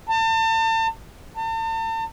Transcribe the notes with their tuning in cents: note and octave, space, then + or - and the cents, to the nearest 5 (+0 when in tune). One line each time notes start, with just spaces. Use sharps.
A5 +35
A5 +40